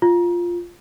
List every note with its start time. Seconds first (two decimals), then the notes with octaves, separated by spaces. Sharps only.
0.02 F4